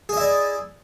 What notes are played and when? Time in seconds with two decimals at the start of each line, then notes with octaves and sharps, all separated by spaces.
0.09 G#4
0.13 D#5
0.17 E4
0.21 D5